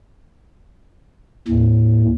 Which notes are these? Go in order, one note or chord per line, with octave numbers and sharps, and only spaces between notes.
D#2 A2